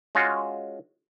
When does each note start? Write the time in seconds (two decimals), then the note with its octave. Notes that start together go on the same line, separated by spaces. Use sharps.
0.15 G#3 C#4 F4 F#4